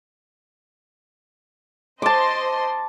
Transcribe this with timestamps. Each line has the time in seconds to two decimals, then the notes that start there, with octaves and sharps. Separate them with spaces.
2.02 C5 D#5 A5 C6 D6